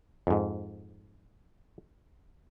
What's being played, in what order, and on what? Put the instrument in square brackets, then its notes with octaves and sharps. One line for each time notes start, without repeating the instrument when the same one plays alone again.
[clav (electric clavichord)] F2 G#2